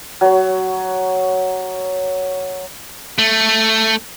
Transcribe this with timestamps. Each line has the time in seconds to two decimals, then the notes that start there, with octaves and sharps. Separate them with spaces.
0.21 F#3 C#5
3.18 A3